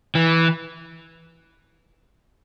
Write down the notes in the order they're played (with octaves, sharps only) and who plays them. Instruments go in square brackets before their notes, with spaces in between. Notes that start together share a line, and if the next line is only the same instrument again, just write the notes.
[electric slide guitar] E3